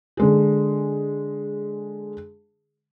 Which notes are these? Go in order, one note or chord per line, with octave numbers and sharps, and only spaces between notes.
D3 G#3 G#4